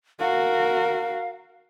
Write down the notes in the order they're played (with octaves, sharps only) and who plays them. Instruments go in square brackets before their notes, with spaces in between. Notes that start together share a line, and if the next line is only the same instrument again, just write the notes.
[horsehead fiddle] F#4 A#4 [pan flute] F5